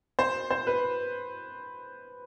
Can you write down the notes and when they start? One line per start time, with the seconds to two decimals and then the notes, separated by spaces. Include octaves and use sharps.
0.19 C5
0.51 C5
0.67 B4